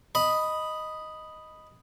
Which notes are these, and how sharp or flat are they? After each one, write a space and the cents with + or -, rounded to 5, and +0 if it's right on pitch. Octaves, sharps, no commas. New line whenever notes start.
D#5 +0 B5 +0